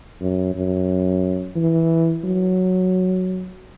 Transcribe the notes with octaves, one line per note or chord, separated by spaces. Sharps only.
F#2
F#2
E3
F#3